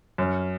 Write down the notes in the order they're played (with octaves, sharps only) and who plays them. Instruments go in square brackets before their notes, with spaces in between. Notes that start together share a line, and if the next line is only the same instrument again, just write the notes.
[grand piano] F#2